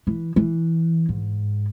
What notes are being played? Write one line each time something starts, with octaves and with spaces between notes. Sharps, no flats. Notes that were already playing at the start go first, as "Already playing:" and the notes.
E3
E3
G#2